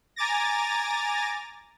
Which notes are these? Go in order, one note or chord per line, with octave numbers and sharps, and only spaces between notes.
G#5 A#5 D6 A6 A#6